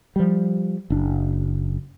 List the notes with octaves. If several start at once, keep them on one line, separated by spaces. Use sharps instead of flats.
F3 G3
F#1 D4